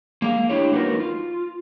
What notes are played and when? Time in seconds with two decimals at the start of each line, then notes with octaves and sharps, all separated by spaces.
0.22 A#3 G#4 F5
0.49 D4 E4 G4 C#5
0.72 A#3 B3 D#4 F#4 A#4
1.00 F4